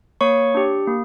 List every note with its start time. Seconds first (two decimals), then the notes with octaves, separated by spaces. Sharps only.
0.21 A#3 C#5 C#6
0.55 D4 G4
0.87 A#3